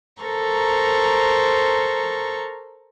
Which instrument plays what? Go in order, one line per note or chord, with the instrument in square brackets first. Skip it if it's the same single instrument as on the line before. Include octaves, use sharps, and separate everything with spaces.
[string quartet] A4 A#4 C5 A#5 C#6